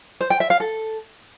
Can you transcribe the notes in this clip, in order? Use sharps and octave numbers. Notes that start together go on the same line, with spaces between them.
C5
G5
E5
F5
A4